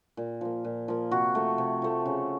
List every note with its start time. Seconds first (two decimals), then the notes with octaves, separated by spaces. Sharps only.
0.17 A#2
0.41 F3 A#3
0.64 A#2
0.88 F3 A#3
1.11 C3 F#4
1.35 F3 A3
1.58 C3
1.82 F3 A3
2.06 C#3